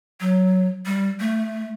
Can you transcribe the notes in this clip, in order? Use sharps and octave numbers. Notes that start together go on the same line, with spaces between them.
F#3
G3
A3